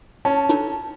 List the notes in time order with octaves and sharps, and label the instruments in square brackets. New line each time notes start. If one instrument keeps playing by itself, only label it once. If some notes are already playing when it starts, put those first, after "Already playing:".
[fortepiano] C#4 [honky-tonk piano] A5
[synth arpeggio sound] D4 D#4 A4